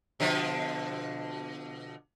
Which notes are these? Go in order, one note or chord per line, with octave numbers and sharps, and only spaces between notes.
B2 D3 F3